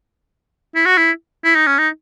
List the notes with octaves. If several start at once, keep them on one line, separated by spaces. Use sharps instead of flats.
E4
F#4
E4
E4
D#4
C#4
D#4